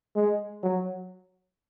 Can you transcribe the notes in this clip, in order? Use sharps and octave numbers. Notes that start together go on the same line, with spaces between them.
G#3
F#3